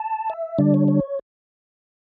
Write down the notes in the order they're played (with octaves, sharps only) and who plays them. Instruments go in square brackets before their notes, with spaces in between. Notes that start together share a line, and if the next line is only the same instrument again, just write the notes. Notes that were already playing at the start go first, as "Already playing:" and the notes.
Already playing: [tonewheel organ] A5
E5
D3 G3 D4 D5
C#5
C#5